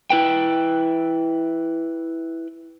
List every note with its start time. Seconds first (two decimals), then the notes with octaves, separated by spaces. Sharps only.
0.10 E4 B4 G5